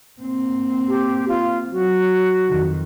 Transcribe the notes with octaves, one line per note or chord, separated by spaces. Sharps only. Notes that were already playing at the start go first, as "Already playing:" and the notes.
A#3 C4
G4
F4
F#3 F#4
F2 D#3